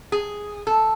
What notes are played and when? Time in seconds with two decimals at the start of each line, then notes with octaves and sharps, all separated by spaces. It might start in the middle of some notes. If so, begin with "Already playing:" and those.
0.12 G#4
0.67 A4